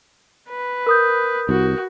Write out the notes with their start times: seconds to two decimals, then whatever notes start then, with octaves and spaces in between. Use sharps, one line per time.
0.49 B4
0.87 A#4 D#6 G6
1.49 C2 F#4